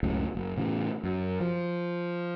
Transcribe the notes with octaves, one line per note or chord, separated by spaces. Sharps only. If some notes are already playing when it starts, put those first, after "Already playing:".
C#2 F#2 A2 C#3
F#1
A2 C#3 E3
F#2
F3